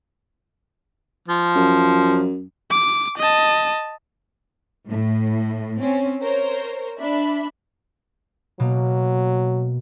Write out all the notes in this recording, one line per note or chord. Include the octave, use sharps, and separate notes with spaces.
F3
F#2
D6
D#5 A5
A2
C4 C#4
A#4 C5 C#5
D4 E5 B5
B2 F#3 A#3